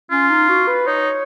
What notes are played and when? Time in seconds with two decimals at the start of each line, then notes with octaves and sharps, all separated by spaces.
0.11 C#4 F4
0.30 D#4
0.49 F#4
0.68 B4
0.87 D#4 C#5